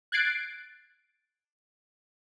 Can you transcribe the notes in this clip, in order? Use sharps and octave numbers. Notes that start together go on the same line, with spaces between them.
F#6 G#6 A6 C7 D7